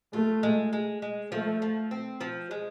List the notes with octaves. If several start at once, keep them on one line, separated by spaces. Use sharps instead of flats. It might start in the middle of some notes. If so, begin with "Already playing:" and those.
A3 F4
G#3
G#3
G#3
F3 A3
F3
C4
F3
G#3